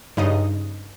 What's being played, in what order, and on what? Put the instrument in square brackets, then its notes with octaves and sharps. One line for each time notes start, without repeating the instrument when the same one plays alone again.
[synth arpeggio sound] G2 C#3 D#4 D#5